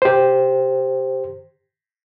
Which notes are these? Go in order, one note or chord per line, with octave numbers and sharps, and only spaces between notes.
G4 C5